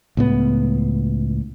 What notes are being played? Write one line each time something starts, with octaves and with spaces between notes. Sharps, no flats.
C#2 A2 B3